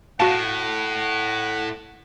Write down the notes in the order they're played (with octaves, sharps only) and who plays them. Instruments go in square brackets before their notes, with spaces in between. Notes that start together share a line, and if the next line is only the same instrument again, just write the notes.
[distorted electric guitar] A2 [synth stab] F#4 F5 [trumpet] F#5 [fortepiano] A5